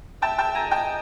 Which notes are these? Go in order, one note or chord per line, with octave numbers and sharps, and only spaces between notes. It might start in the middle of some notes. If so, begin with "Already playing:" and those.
E5 G5 A5
G5 A5
G#5 A#5
D#5 G5 A5